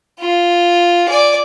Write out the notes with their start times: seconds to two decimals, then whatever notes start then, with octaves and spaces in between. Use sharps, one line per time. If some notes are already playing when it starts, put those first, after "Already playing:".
0.19 F4
1.09 D5 G#5